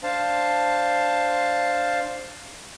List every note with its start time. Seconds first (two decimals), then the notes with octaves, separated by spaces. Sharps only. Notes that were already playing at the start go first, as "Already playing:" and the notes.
0.03 D4 C5 F5 A5